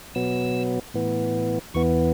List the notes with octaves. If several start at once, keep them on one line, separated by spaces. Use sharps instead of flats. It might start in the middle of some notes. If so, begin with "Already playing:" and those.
B2 F#3 B3 E6
A2 E3 B3
E2 E3 B3 C#6